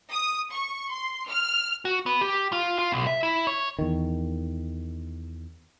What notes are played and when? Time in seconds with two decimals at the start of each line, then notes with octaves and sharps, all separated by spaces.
0.12 D#6
0.52 C#6
0.91 C6
1.28 F6
1.85 F#4
2.06 B3
2.21 G4
2.52 F4
2.78 F4
2.92 B1
3.07 E5
3.23 E4
3.47 C#5
3.79 E2 D#3